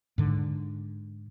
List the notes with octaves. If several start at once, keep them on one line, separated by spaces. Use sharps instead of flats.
G#2 D3